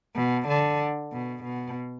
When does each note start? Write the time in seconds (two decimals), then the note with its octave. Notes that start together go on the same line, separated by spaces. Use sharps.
0.16 B2
0.48 D3
1.12 B2
1.44 B2